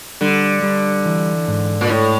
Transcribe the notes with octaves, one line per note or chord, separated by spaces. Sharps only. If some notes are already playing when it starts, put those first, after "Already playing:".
D3 G3
G3
E3
G#2
A#2
A2 A3